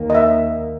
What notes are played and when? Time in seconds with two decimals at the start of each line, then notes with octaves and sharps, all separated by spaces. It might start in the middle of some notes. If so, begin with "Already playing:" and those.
Already playing: D#2 D#3 A#3
0.10 D#5
0.15 E5